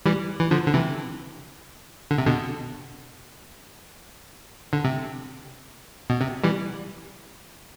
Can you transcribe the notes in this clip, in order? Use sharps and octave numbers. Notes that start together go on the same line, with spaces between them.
E3 G3
E3
D3 F3
D3
C3 E3
D3
C3
B2 D3
D3
C3
B2
C3
E3 G3